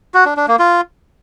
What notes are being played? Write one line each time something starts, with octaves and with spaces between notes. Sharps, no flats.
F#4
D4
D4
A#3
F4